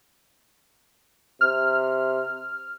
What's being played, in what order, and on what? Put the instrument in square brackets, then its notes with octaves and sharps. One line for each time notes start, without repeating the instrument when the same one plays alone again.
[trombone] C3 [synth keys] F6